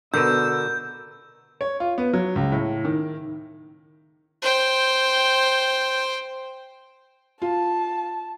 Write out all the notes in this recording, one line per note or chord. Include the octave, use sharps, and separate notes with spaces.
B2 D3 B3 A#4 E6 G6
C#5
F4
B3
F#3
C#2
A2
D#3
C5 G5
F4 A5